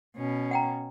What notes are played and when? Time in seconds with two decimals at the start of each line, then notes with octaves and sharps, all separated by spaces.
0.17 B2 C#4
0.51 F#5 G5 A#5